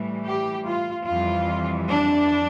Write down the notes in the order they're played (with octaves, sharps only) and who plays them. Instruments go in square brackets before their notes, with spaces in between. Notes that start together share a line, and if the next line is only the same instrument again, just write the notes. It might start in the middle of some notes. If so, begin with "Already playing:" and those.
Already playing: [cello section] A2 E3 G3
G4
F4
F2 E3 G3 F4
D4